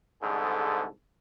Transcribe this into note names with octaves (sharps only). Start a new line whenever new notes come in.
C2 G#2 D3 G#4 A4